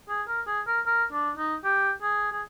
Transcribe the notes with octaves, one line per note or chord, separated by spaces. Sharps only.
G#4
A#4
G#4
A#4
A#4
D4
D#4
G4
G#4
G#4